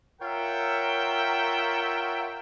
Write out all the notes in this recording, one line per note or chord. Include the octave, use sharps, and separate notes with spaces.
F4 A#4 C#5 E5 F#5 G5